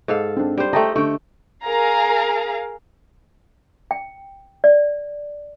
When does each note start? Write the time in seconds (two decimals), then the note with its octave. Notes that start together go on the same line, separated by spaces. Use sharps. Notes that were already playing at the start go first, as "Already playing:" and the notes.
0.08 G#2 A4 F5
0.37 C4 D4
0.58 G3 C5
0.73 A3 G4 D#5 G5 A5 A#5
0.95 D3 A3 G5 C#6
1.65 G#4 A#4 F5 A#5
3.91 G5
4.64 D5